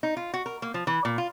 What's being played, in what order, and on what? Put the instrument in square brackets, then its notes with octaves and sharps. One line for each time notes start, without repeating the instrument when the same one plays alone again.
[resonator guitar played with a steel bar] D#4
F4
F#4
A#4
A#3
F3
E3
A#2
F4